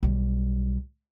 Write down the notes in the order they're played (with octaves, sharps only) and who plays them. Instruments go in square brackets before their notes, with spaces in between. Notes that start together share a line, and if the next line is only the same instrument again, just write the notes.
[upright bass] B1 G3